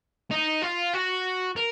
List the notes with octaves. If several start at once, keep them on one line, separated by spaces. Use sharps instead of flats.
D#4
F4
F#4
A#4